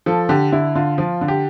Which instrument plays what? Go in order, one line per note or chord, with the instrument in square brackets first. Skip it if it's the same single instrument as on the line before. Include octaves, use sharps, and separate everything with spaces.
[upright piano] F3 A4
D3 G4
D3 E4
D3 F4
F3 F4
D3
G4